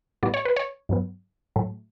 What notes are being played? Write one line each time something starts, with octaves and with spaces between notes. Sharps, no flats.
A2 G3 B3 D5
C#5
B4
C#5
G2 F#3 B3
A2 F#3 A3